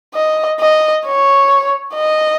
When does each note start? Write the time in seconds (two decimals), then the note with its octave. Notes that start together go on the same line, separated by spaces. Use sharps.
0.15 D#5
0.60 D#5
1.05 C#5
1.94 D#5